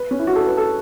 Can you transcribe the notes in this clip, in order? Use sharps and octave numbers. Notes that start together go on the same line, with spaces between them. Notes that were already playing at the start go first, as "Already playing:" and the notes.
Already playing: B4
C#4
E4
F#4
A4
B4
A4